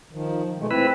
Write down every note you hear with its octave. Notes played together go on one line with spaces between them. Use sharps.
D#3 F3
B2 G#3 A3
C4 E4 B4